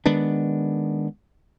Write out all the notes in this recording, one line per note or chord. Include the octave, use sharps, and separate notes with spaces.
D#3 G#3 B3 D4